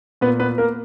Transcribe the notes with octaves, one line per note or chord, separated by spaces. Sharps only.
A#2 B3 B4
B3 B4
A#3 A#4